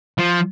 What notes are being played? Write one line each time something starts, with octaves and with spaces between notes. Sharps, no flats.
F3